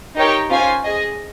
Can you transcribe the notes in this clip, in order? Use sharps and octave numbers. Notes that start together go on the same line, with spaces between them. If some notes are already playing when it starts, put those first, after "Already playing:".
D#4 G4 A#4 C#5 G5
C#4 F4 C5 F5 G#5
G#4 D#5 G#5